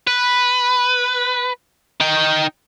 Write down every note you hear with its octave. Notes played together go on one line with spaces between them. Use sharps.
B4
D#4 G5